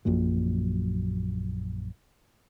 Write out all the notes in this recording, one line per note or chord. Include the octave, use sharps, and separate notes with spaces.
A#1 F#2 A#2 F#3